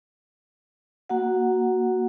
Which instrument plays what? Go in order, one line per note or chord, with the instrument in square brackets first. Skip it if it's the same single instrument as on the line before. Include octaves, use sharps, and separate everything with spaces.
[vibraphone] A#3 F#4 F#5